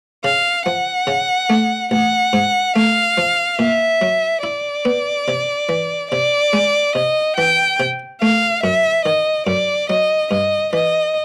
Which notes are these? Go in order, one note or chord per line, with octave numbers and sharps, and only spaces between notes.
C#3 F5
F3 F#5
C#3
A3
A1 F#5
G#2
A3 F5
F3
A#2 E5
F#3
E4 D5
B3
C3
E3
C3 D5
G#3
C3 D#5
E3 G5
C3
A3 F5
F#2 E5
D#3 D#5
F#2 D5
F#3 D#5
G2 D#5
E3 D#5